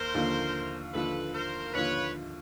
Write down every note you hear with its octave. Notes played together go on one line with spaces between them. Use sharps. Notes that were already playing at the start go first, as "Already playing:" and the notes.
Already playing: D#2 A#4 C5
D#2 D3 F3
D#2 D3 F3 A4 B4
A#4 C5
D#2 D3 F3 B4 C#5